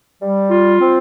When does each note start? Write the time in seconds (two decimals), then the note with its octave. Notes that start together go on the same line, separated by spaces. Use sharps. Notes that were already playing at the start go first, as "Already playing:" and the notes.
0.22 G3
0.51 F4
0.81 C4